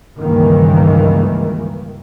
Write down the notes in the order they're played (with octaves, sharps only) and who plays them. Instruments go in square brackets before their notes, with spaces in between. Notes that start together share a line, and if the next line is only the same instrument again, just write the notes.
[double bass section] C#2 G2 D#3 E3 A#3